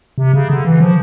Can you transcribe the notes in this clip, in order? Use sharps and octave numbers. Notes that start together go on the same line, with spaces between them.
C3
C#3
D3
E3
F3